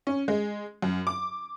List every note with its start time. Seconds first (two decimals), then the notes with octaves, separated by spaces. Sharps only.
0.07 C#4
0.28 G#3
0.82 F#2
1.07 D6